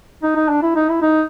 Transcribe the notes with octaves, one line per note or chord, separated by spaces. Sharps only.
D#4
D#4
D4
E4
D#4
E4
D#4